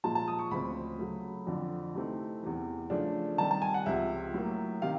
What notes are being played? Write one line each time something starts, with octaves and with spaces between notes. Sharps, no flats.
A#2 F3 G#3 A5
A5
D#6
C#6
D2 C#3 F3 G#3 C4 B5
C#3 F#3 A3
F2 D3 F3
C3 E3 A3 C4 D#4
E2 C3 E3
C#3 F3 A3 D4
C3 D#3 G3 A5
A5
G#5
F#5
C#2 C3 F3 E5
A2 F#3 A#3
C3 D#3 F5